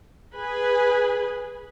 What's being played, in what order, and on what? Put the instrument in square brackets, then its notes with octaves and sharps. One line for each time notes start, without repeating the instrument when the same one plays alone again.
[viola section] G#4 B4 G#5